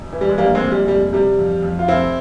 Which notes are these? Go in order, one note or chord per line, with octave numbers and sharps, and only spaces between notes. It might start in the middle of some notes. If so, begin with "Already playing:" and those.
Already playing: E1
E3
G3
G#3
A#1 G3 A#3
G#3 C4
A#2
G3
F1 G3
C3 G3
F2
F2
F4
F1 C4 E4